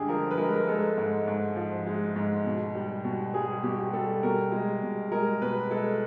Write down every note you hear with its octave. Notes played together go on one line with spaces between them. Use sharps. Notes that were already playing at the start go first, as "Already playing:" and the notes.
Already playing: G2 D3 G#3 G4 G#4
F3 A#4
B4
G#3 A#4
A#4
G#3 A4
G#2
G#2
F3
G#3
G#2
B2
G3
B2
G3 G#4
B2 G4
F#4
G4
G3 A4
B2 A#4
G#3
B2
G#3 A#4
B2 B4
G#3 A4